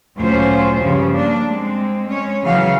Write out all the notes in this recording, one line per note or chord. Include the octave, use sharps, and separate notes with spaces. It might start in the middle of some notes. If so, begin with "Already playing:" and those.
D2 A#2 F#3 C#4 F4 C5
G2 C#3 F3 G3 C#4
A#3 D4
G#3 C4
G#3 C#4 C#5
C#3 E3 F#3 F#4 F5